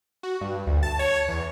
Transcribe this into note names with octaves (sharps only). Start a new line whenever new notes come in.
F#4
G2
D2
A5
C#5
E2